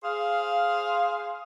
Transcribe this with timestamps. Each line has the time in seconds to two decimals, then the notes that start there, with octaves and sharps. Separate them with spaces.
0.03 G#4 C5 F5